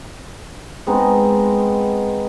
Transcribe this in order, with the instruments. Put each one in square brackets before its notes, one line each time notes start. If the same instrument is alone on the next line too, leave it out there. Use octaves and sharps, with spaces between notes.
[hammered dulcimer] G#3 B3 C4 D#4